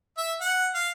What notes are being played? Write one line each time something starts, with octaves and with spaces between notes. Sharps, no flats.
E5
F#5
F5